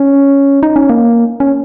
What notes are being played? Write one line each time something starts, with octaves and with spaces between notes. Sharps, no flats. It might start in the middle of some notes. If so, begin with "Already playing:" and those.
Already playing: C#4
D#4
C#4
A#3
C#4